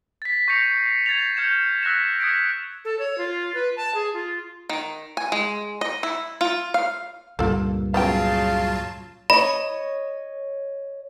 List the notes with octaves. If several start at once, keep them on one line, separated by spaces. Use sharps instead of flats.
A6 B6
C#6 G6 A#6 C7 C#7 F7
G#6 A6 B6 F7
F6 G6 G#6 C#7 E7 F7
E6 F#6 A#6 B6 E7
D#6 G#6 A#6 B6 C#7 D7
A4
C#5
F4
B4
A5
G#4
F4
D#3
G#5
G#3
D#5
E4
F4
F5
C#2 G2 A#2 F4 A4
C#3 F#3 B3 C#4 F4 F5 G5 A5
C#5 D#5 B5